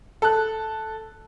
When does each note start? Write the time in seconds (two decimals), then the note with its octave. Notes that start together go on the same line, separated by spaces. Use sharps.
0.22 A4 F#6